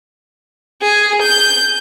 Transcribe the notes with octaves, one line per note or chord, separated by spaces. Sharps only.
G#4
G6